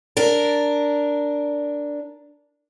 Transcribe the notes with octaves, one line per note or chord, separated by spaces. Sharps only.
D4 A#4